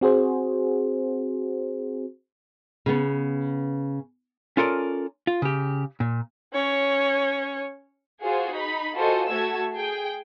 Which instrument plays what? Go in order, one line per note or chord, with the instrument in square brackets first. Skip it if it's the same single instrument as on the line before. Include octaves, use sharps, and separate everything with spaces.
[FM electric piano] C4 F#4 G#4 C5
[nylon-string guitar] C#3 B3
[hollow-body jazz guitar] C#4 F4 A4 A#4 D5
F4
C#3 G4
A#2
[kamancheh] C#4 C#5
[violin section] F4 F#4 G#4 C5
D#4 B5
F4 F#4 G#4 A4 C5 D#5
A3 F#4 A5 E6 G#6
G#4 G5